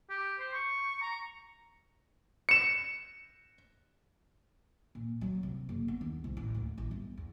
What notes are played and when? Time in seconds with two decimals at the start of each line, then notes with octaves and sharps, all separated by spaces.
0.10 G4
0.40 C5
0.54 C#6
1.01 A#5
2.49 C#7 E7
4.95 A#2
5.21 F#3
5.43 C3
5.69 F#1
5.88 B3
6.01 D#2
6.24 C2
6.37 A1
6.54 D2
6.78 A1
6.91 G1
7.18 E2